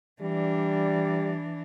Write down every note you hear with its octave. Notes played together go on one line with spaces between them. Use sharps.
E3 G3 D4